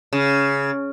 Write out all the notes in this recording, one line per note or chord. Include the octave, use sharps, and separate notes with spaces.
C#3